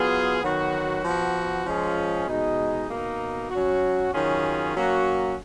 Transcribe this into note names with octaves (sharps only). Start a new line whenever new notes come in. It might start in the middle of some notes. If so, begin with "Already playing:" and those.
Already playing: F#3 B3 F4 G#4
D#3 F#3 B3 F#4
F3 B3 F#4
F3 G#3 C#4 F4 G#4
B2 G#3 D#4
B2 A#3 D#4
F#3 C#4 F#4
D#3 F#3 C#4 F4 G#4
F#3 A#3 C#4 F#4